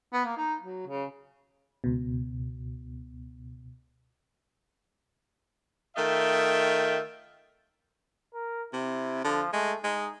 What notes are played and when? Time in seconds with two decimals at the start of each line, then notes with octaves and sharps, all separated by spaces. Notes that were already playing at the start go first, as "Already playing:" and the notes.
0.13 B3
0.25 A#3
0.37 D#4
0.63 F#3
0.87 C#3
1.84 C#2 B2
5.96 D#3 A3 F4 D#5 E5 G5
8.34 A#4
8.73 C3 E4
9.24 D3 F3
9.53 G#3 A3
9.84 G#3 D#4